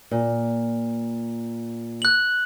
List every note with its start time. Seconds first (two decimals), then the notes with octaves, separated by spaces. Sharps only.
0.11 A#2
2.02 F#6 F#7